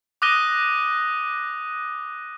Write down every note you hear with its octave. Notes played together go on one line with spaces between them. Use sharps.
D6 D#6 F#6 A#6 D#7 G7